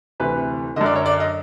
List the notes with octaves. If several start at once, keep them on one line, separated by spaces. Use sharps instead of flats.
D2 C3 E3 B4
F#2 D3 D#5
D5
C#5
D5
D#5